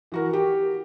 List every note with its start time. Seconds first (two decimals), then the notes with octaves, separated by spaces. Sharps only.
0.12 E3 F#4 A#4
0.33 G4